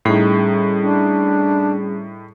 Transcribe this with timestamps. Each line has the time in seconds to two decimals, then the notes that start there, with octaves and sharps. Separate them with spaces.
0.05 A2 G3 C#4 D#4 G#4
0.78 D4